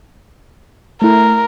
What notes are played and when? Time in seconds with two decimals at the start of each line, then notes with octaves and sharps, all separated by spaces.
1.02 A3 E4 A#4